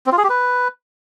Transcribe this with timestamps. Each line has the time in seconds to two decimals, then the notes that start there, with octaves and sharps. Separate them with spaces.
0.06 C4
0.12 F4
0.18 G#4
0.24 G4
0.29 B4